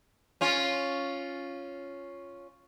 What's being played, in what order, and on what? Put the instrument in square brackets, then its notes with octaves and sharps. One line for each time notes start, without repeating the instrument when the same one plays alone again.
[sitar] C#4 F4 C#5